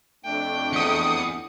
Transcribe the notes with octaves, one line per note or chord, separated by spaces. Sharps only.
F2 A3 D4 G5
E2 D#6 C#7